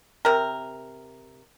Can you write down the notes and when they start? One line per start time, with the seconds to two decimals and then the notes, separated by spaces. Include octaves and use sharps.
0.25 C3 A#4